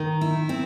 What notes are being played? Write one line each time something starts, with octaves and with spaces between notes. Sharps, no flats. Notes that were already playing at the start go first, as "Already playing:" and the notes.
Already playing: D#3
E4
C4